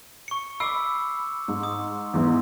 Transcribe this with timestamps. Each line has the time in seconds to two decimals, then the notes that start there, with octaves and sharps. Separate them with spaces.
0.28 C#6 C#7
0.60 B5 D6 E6 C7 D7
1.48 G#2
1.63 D#6
2.14 E2 G#2 E3